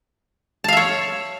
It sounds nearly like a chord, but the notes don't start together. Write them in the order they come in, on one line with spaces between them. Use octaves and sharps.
A5 F5 E5 C#5